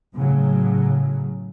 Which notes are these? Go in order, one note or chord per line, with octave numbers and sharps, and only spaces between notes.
A2 C#3 F#3